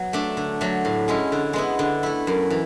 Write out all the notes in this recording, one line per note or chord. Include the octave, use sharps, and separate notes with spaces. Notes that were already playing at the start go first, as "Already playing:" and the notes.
Already playing: F#3 B3
A3 D4
D3
F#3 A3
A2
G#3 C#4 E4
D3
G#3 B3 E4
D3
A3 E4
F#2
E3